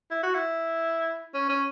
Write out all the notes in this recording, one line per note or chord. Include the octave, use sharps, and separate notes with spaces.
E4
F#4
E4
C#4
C#4